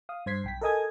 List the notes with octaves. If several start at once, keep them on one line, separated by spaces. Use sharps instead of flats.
F5 D#6
G2 C5 G#6 B6 C7
B1 G5 B6
A4 A#4 D#5 G#5 D#6 G#6